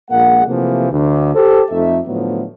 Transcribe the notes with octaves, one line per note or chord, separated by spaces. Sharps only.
A#1 A#2 G#3 A#3 F#5
C3 E3 F3 A3 A#3
D2 D3
G4 A4 C5
F2 A3 D#4 E5
A2 D3 F3 F#3 A3 B3